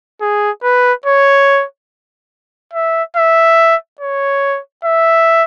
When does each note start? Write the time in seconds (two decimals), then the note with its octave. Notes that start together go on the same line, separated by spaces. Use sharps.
0.21 G#4
0.63 B4
1.06 C#5
2.74 E5
3.16 E5
4.01 C#5
4.85 E5